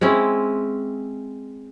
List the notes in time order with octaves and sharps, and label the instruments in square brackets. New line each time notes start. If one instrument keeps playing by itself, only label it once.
[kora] G#3 C4 C#4 E4